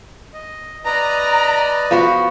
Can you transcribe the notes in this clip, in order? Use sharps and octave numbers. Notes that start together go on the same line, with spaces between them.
D#5
B4 D5 D#5 A#5
F3 B3 F#4